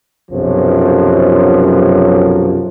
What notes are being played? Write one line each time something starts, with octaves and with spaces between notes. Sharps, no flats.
B1 F#2 C3 F3